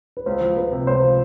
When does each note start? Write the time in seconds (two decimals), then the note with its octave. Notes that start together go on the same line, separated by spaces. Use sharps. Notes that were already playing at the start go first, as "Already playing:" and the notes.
0.17 B4
0.26 C#2 C5
0.41 F3
0.57 C#2 B4
0.72 C3
0.87 C#2 C5
1.03 F3